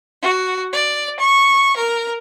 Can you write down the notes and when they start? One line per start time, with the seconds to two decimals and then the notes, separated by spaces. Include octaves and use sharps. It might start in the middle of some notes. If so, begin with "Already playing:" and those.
0.22 F#4
0.71 D5
1.19 C#6
1.77 A#4